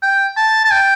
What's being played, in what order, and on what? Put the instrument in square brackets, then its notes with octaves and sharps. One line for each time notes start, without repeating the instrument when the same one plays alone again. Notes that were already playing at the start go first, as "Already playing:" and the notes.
[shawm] G5
A5
A5
G5